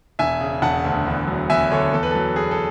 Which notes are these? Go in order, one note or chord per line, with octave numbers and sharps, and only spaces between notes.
E1 E5 G#5
C#3
E1 F#5 A5
D2
E2
F#3
E2 E5 G#5
D3 A4 C#5
E2 A4
B4
F#3 A4
E2 G#4
A4